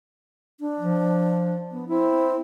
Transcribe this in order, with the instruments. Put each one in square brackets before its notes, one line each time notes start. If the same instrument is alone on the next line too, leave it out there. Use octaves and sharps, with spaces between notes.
[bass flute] D4
[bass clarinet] F3
[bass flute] B3
[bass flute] C4 [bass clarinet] E4